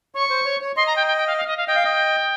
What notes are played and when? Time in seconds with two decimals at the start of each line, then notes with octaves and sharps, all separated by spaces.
0.15 C#5 C#6
0.30 C5
0.45 C#5
0.61 C#5
0.76 D#5 C6
0.87 A#5
0.96 G5
1.07 G5
1.17 G5
1.27 F5
1.37 F5
1.47 D#5
1.57 F5
1.67 D#5 G5
1.75 F5
1.85 D#5